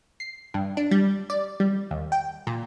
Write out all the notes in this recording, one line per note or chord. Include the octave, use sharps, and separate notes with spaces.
C7
G2
D4
G3
D5
G3
D#2
G5
A#2